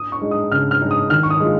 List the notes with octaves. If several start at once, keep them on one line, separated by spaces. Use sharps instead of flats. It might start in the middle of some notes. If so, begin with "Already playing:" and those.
Already playing: D#6
C#6
G#3 D#4
D#6
C#3 F6
F6
G#3 D#4
D#6
D#3 F6
C#6
D#6
G#3 F4